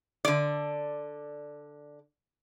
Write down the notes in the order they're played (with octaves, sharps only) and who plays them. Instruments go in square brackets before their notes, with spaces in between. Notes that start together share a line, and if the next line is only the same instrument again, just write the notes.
[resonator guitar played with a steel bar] D3 D5